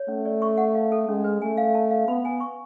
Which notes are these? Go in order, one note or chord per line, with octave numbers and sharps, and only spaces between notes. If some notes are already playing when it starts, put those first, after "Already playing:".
Already playing: C#5
A3 C#4
D5
C#6
F#5
F5
A4
G#3 C#4
B4
A3 G#5
F5
A5
F5
B3 B5
G#5
C#6